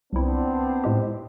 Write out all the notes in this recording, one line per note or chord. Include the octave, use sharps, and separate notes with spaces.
C2 B3 C4 D4 E4
A2 G#3 G4